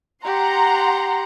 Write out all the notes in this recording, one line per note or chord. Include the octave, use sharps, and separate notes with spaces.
G4 F#5 A#5 C6